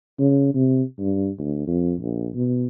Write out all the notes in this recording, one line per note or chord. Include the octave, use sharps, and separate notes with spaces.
C#3
C3
G2
D2
F2
A#1
B2